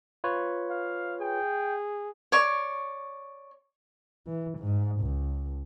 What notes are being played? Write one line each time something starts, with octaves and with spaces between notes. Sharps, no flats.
F4 B4 C#5
F5
G#4 G5
C#5 D5 C#6
E3
G#2
C#2